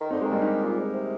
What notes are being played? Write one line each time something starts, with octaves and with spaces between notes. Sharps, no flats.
D#3
D3 C4 D#4
D#3 G#3
G3 A#3
D#4 G4
A#2
G#2
C3